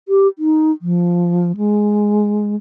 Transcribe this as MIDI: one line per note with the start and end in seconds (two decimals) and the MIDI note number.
0.08 0.28 67
0.39 0.72 63
0.82 1.56 53
1.57 2.56 56